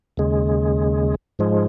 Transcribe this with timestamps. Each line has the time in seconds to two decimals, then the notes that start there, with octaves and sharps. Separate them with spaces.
0.17 D#2 C#3 G#3
1.39 G#2 F3 G#3